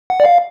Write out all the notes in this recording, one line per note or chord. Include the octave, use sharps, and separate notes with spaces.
F#5
D5
F5